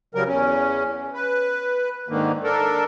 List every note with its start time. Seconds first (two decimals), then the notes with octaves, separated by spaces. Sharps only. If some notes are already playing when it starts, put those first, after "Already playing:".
0.15 C#3 F#3 G3 A#4
0.27 E2 C#4
1.14 B4
2.09 G#2 D3 D#3 A#3
2.43 D4 A4 A#4